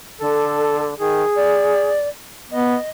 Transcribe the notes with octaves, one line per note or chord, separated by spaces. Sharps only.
D3 A4
D#3 G#4
D5
B3 D#5